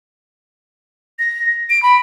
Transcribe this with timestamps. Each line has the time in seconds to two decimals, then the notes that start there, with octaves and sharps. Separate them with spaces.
1.19 A#6
1.70 D7
1.83 B5